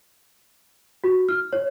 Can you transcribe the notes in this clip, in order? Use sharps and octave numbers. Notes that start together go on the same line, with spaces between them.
F#4
F6
C#5